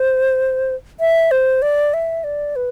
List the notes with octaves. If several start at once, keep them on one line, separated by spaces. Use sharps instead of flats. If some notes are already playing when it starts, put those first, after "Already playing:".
Already playing: C5
E5
C5
D5
E5
D5
B4